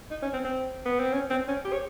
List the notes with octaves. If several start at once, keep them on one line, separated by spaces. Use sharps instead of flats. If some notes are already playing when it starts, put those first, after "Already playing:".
D#4
C#4
C4
C4
B3
C4
C#4
C4
C#4
G4
C#5